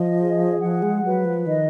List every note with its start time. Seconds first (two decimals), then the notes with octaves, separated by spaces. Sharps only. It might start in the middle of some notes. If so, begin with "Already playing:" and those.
Already playing: F3 D#5
0.18 G#4
0.61 F3 F#5
0.82 G#3
1.04 F#3 B4
1.25 F3
1.47 D#3 D#5